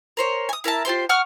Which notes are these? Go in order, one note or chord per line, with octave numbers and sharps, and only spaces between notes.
A#4 C5 C#5
G#5 D#6
E4 A#4 E5 A5
F4 G4 C5 C6
F#5 C#6 D#6 F6